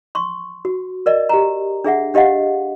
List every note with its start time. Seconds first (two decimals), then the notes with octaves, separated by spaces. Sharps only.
0.15 C6 C#6
0.65 F#4
1.06 A#4 D5 D#5
1.29 G4 A#5
1.84 D4 G#4 E5 F#5
2.14 D4 G4 D#5 F5 F#5